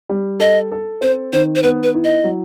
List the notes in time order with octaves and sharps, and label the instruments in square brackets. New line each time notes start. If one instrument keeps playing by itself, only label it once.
[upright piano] G3
[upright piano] A4 [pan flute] D#5
[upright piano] A4
[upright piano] C4 [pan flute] C5
[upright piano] D#3 [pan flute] C5
[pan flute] C5
[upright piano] B3 [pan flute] B4
[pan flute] B4
[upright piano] E4
[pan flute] D#5
[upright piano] F#3